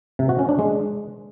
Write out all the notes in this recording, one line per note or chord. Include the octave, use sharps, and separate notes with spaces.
C3
F#4
C#4
D4
G#3